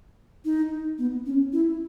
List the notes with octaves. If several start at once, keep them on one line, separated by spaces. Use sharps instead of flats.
D#4
B3
C#4
E4